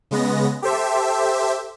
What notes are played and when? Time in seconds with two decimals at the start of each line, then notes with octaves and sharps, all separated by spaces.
0.11 C#3 G#3 B3 A#6
0.62 G4 A4 C5 E5